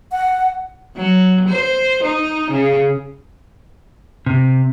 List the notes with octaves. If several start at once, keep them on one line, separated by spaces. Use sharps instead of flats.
F#5
F#3
C5
D#4
C#3
C3